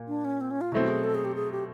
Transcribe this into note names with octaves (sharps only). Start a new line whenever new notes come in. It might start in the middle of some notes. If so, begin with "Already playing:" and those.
Already playing: A#2 A#3
D4
C#4
C4
C#4
F4
B2 F#3 A3 C4 E4
G#4
A4
G#4
G4
G#4
G4